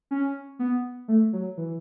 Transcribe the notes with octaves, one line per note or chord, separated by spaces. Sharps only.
C#4
B3
A3
F#3
E3